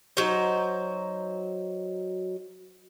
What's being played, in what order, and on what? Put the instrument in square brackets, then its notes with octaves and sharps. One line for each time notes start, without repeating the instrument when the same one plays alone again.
[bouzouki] F#3 D#4 C5